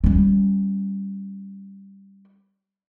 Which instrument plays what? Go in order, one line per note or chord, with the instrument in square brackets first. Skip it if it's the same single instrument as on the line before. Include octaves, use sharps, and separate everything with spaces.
[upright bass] G3 C#4